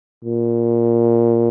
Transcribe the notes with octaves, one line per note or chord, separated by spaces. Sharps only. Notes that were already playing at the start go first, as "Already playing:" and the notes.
A#2